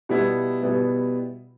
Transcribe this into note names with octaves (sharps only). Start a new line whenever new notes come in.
B2 G3 B3 E4
B2 G3 B3 E4